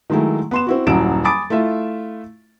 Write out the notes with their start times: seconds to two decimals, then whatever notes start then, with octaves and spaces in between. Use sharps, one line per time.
0.10 D#3 F#3 G#3 A3 E4
0.51 B3 C6 E7
0.67 C4 E4 F#4
0.87 D#1 F#2 F#3 E4 D7 E7
1.24 G#5 B5 D6 D#6 A6 D7
1.50 A3 E4 F4 E5